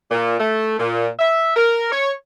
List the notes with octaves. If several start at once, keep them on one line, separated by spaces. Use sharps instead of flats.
A#2
A3
A#2
E5
A#4
C#5